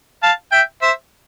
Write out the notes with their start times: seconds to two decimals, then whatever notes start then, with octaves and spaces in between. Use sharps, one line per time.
0.23 F5 A5
0.52 E5 G5
0.82 C5 E5